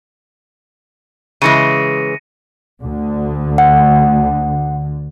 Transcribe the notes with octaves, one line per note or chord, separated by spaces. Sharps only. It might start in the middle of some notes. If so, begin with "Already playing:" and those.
C#3 E3 G#3 A#6 C#7 D#7
D2 D3
F#5